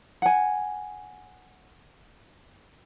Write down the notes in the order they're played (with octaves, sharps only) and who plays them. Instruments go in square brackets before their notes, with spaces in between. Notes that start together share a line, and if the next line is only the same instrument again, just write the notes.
[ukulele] F#5 G#5